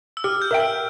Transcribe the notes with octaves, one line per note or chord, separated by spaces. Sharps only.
E6
G4 F6
G6
A#4 E5 G5
E6